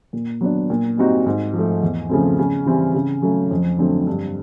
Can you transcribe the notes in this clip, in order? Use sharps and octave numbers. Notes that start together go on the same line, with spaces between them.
A#2
F#3 B3 D4
A#2
G3 C4 D#4 F#4
G#2
F3
A3
E2
C#3 F3 A3 C4
C#3
E3 G3 C4
C#3
F#3 A3 C#4
F2
D3 F#3 A3 C4
G2